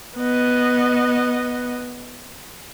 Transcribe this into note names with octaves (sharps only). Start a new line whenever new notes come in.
B3 D#5